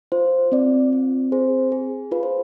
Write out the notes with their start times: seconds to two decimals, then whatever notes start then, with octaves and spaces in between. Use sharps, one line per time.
0.12 F4 C5
0.52 C4 D5
0.93 C4
1.32 G#4 C5
1.72 G#4
2.12 F4 B4
2.23 C5